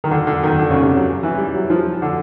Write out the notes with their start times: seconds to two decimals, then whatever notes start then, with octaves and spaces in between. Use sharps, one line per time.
0.04 D#3
0.11 D3
0.27 D3
0.43 D#3
0.59 D3
0.71 C#3
0.83 C3
0.95 F#3
1.06 F#3
1.23 E3
1.38 G3
1.54 F#3
1.70 F3
2.02 D3